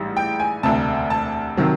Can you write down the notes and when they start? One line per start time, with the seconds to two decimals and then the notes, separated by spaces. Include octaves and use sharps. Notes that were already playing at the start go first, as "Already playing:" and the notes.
Already playing: A1 G#2 E3 G3
0.17 G5
0.40 G#5
0.63 E1 D2 C3 A5
1.10 A5
1.57 C3 D#3 F#3